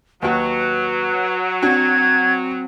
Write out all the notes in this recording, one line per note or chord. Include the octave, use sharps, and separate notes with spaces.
D#2 F#3 F#4 B4
C4 D4 F#4 G#6